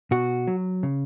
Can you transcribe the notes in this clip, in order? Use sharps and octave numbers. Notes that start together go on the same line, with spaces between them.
B2 F#4
F#3
C#3